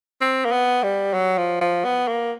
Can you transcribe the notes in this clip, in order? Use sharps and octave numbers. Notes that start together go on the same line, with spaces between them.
C4
A#3
B3
G3
F#3
F3
F3
B3
A#3